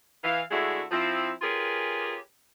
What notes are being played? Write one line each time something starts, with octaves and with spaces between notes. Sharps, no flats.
E3 F5
D3 G#3 A3 D4 E4 F#4
F3 C4 E4
C#4 F4 G4 G#4 A#4 B4